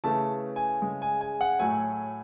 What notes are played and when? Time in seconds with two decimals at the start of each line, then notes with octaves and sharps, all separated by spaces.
0.04 C#3 E3 A3 A5
0.56 G#5
0.82 C#3 G#3
1.02 G#5
1.21 G#5
1.41 F#5
1.59 A2 F#3 A3 G#5